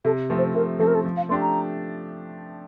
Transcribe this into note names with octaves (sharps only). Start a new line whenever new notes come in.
C3 A4
F3 A3 C4
C5
C3 A#4
F3 A3 C4 A4
A#4
A4
F3
F5
A3 D4 G4 C6
A#5